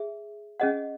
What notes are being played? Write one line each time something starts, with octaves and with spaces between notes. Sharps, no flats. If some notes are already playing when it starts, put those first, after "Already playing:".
Already playing: G#4 E5
C#4 G#4 D#5 F#5